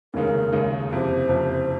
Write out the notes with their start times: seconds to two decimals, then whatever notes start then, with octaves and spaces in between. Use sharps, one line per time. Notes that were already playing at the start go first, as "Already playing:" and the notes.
0.14 F1 D#2 C#3 G#3 D#4 A#4
0.52 F1 D#2 C#3 G#3 D#4
0.91 F#1 F2 C3 C5
1.29 F#1 F2 C3